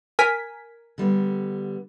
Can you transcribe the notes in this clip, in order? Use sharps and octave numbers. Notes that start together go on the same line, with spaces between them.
A#4 G#5 B6
D3 G3 B3